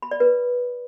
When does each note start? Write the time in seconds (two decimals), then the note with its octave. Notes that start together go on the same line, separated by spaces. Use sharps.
0.02 B5
0.11 D5
0.20 B4